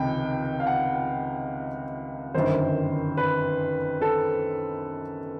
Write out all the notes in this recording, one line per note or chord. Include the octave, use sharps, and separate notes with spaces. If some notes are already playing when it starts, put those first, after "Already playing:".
Already playing: C#2 C3 D#3 G5
F5
F#5
G1 F#2 D#3 C5
B4
A4